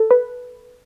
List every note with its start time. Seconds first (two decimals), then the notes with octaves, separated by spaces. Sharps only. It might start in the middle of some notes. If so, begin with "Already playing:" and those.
Already playing: A4
0.11 B4